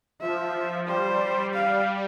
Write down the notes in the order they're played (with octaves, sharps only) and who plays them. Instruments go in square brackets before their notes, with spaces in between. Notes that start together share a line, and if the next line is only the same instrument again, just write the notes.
[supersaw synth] F3 [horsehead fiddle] E5
[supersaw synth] G3 [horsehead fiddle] C5
[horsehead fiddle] F5